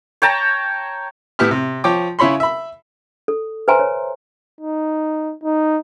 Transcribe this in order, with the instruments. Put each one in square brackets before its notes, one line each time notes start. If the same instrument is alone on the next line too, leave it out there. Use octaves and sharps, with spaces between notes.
[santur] C#5 G5 A5 A#5
[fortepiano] A2 B3 E4 G4 E5 F6
C3
F3 C#5 G5 D6
C#3 E4 C#5 B5 C6
E5 B5
[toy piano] A4
B4 C5 E5 G#5 A#5 C6
C#5
[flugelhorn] D#4
D#4